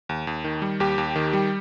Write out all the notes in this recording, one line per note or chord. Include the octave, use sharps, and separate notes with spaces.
D#2
D#2
D#3
G3
D#2 G4
D#2
D#3
G3